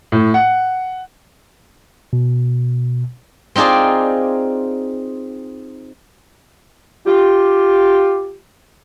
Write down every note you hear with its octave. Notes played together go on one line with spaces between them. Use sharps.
A2
F#5
B2
C4 D#4 F4 G#4 D5
F4 G4